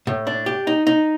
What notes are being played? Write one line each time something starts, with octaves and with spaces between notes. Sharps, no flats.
A2
D4
G4
D#4
D#4